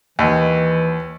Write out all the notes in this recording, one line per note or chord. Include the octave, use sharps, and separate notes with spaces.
D#2 E3